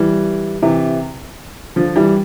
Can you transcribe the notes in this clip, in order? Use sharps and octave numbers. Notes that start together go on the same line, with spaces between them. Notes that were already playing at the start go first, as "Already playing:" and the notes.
Already playing: E3 G3
C3 E3
D3 F3
E3 G3